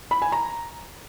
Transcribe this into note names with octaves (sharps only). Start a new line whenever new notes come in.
B5
G#5
A#5